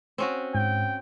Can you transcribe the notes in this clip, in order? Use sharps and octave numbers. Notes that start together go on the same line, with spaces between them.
C4 C#4 F#4
G#2 G5